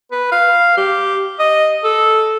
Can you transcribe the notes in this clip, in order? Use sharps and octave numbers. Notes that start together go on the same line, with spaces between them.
B4
F5
G4
D#5
A4